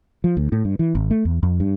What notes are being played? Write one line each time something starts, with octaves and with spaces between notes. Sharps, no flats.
F3
D2
A2
G2
E3
G#1
A3
E2
F2
G2